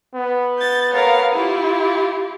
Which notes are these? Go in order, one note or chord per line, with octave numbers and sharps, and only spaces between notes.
B3
G6 A6
A#4 C#5 F5
E4 F4 G4